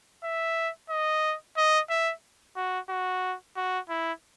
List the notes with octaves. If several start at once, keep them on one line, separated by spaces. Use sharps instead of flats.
E5
D#5
D#5
E5
F#4
F#4
F#4
E4